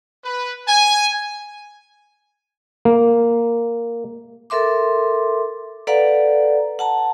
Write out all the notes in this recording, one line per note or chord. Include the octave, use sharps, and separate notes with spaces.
B4
G#5
A#3
A4 A#4 E5 C6 D6
A4 B4 D5 F5 F#5 A#5
F#5 A5 A#5